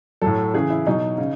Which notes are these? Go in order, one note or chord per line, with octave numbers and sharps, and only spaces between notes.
A2 F#3 A4
C#3 E3 G#4
E4
B2 F#3 D#4
C#3